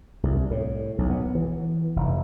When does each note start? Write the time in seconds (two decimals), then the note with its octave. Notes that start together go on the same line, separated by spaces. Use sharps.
0.23 C2
0.51 A2
0.98 B1
1.10 B3
1.35 E3
1.96 F1